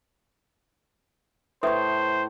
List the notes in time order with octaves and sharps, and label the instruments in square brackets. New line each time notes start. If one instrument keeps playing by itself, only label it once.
[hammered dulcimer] A2 C#6 [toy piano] B4 E5 D#6 [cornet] C5